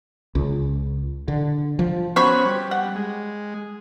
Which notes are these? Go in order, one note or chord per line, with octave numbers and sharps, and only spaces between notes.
C#2
D3
F3
B3 C#4 F#4 C5 B5 C#6
G3
F#5
G#3